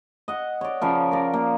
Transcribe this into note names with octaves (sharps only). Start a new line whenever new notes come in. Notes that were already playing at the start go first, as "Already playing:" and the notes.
D#5 F#5
C#5 D5
C#3 F3 A#4
A#4 D5
A#3